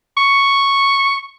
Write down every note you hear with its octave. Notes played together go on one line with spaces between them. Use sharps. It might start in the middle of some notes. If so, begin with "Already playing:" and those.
C#6